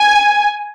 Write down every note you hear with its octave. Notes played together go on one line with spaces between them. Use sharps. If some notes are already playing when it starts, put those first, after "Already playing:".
Already playing: G#5